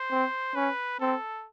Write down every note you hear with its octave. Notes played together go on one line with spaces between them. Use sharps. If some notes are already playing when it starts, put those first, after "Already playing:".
Already playing: C5
C4
C#4 B4
C4 A4